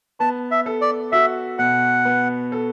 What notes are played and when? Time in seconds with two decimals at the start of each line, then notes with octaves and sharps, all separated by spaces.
0.20 B3 A5
0.51 E5
0.66 A4
0.81 D5
1.12 F#4 E5
1.59 B2 F#5
2.05 B3
2.52 A4